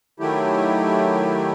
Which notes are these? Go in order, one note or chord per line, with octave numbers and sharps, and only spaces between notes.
D#3 F#3 A3 E4 G4